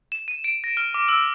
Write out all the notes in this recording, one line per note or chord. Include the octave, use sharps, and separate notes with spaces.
E7
D#7
D7
A#6
F6
D6
E6